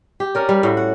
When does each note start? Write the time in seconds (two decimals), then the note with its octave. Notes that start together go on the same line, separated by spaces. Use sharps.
0.20 G4
0.35 C#4 A#4 D5
0.49 G3
0.63 A2 F#4
0.77 F#5